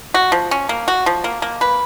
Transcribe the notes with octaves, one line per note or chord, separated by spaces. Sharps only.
F#4
F3
C#4
A#3
F#4
F3
A#3
A#3
B4